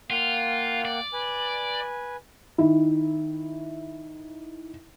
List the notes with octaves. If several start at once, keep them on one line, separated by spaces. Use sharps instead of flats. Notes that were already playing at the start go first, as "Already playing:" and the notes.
A#3 F4 F#5 G5
D5
B4 G#5
D#3 E4